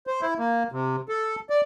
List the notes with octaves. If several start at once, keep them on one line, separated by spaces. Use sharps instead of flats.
C5
E4
A#3
C3
A4
D5